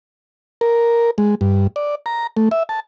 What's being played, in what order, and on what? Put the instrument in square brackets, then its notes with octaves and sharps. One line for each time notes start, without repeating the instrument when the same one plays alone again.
[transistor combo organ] A#4
G#3
G2
D5
A#5
A3
E5
A5